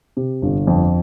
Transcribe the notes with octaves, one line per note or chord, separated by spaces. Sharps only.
C3
G1
F2